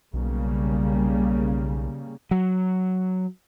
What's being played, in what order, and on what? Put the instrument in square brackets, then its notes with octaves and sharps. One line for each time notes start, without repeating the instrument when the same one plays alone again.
[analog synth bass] B1 [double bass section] C#3 G3 A#3
[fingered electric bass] F#3